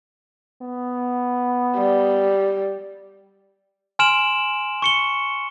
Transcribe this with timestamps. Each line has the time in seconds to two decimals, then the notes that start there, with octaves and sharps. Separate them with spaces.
0.62 B3
1.76 G3
3.99 G#5 C6 F6 D7 E7 F#7
4.82 C#6 C#7 G7